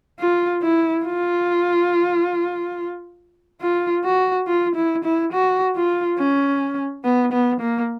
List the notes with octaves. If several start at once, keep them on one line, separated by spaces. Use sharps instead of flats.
F4
E4
F4
F4
F#4
F4
E4
E4
F#4
F4
C#4
B3
B3
A#3